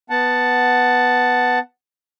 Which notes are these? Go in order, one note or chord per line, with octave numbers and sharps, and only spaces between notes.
B3 F#5 A5